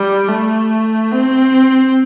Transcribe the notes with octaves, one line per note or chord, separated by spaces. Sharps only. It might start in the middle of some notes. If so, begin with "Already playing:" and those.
Already playing: G3
A3
C4